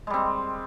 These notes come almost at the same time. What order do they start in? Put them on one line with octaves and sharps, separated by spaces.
G#3 G3 C4